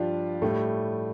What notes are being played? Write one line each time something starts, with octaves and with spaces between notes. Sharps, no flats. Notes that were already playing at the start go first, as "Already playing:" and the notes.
Already playing: G2 F3 D4 F4 G4
A2 G3 A3